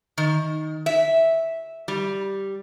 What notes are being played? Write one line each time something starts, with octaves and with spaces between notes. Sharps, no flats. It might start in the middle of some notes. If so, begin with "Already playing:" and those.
D#3
E5
G3